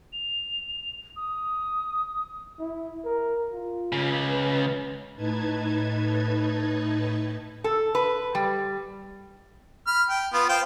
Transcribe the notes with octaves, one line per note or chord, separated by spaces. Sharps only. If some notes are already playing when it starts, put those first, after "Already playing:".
F7
D#6
E4
A#4
F4
C#2 C#3
B4
A2 D#4 B4 A5 G#6
A4
B4
G3
B5 F6
G5
B3 F4
C5 F5 G5